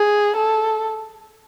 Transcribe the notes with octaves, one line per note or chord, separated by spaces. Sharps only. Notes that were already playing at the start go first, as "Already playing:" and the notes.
Already playing: G#4
A4